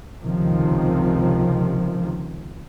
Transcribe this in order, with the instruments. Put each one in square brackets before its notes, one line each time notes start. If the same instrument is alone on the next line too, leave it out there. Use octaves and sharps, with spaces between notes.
[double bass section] C#2 C3 D#3 F3